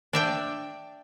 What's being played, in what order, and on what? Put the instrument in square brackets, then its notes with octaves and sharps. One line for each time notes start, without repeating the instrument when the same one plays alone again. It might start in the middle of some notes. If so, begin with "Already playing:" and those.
[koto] D4 E5 G5